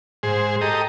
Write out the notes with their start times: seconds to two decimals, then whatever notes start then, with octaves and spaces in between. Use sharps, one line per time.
0.23 G#2 G#4 C5
0.61 G4 A4 D#5 A#5